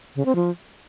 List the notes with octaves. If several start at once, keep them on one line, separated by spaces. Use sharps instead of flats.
C#3
C4
F3